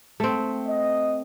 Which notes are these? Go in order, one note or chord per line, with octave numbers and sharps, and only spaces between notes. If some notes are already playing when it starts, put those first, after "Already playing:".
A3 C4
D#5